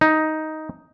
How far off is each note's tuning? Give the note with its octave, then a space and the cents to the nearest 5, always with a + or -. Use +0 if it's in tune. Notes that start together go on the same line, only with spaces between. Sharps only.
D#4 +5